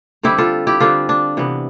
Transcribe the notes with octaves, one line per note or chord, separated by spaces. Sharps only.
D3 G3 C4 E4 G4
F4 A4
E4 G4
D3 G3 C4 D4 F4
D4
C3 E3 B3